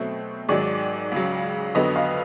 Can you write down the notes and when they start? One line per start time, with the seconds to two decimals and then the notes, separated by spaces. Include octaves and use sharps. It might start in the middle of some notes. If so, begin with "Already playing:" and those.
Already playing: B2 F#3 A3 C4 C#5
0.49 G#2 D#3 F#3 D5
1.12 C#2 C#3 F#3
1.75 F2 D3 F#3 B3 D#5
1.96 F5